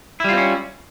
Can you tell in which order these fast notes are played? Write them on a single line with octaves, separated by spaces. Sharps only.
E4 G3 F4 C4 C#4